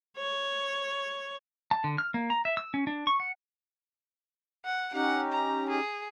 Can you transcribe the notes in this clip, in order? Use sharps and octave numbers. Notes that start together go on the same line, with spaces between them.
C#5
A5
D3
F6
A#3
A#5
E5
E6
C#4
D4
C#6
F#5
F#5
C#4 D#4 G4 F#5
A#5
G#4